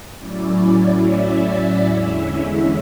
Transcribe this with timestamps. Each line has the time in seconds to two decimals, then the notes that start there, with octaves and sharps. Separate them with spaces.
0.19 A2 F#3 C#4 E4 D5
1.02 E5
1.86 E2 D3 G#3 C#4 E4 E5